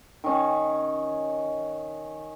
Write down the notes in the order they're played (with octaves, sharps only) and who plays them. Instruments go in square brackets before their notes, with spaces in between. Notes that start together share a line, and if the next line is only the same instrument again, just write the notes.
[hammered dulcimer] D#3 C#4